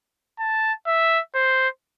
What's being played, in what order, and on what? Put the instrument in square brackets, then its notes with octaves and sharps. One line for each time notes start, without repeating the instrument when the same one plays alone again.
[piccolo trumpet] A5
E5
C5